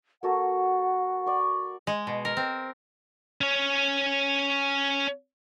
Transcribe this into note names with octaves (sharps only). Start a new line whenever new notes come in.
A#3 F#4 A4 F#5
D5 C#6
G#3
B2
A#4
C4
C#4 C#5